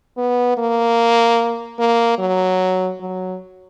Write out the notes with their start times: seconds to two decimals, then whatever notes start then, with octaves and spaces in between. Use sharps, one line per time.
0.18 B3
0.58 A#3
1.79 A#3
2.19 F#3
3.00 F#3